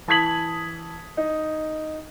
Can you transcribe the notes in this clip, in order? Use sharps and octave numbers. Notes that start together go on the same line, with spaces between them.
E3 A5 D#6 G#6 B6 F#7
D#4